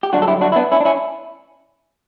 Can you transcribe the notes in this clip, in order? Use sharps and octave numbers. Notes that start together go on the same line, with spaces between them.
G4
G2 D3 F#3 D4 F#4
A4
E4 G4
D4 F#4
E4
B3 D4
C#4 E4
D4
C#4 E4